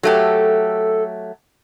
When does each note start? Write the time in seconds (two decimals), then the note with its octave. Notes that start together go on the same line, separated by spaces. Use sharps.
0.03 F#3 A3 G4 A4